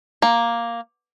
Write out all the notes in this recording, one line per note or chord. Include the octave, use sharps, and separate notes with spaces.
A#3